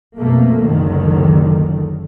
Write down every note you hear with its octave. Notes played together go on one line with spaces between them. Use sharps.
F2 B2 A3 A#3
F#1 C#2 D3 D#3